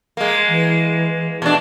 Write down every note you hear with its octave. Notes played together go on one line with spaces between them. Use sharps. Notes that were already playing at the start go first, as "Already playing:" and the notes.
G#3 A#3
E3
B2 A3 D4